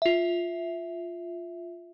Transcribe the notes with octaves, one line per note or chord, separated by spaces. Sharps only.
F4 E5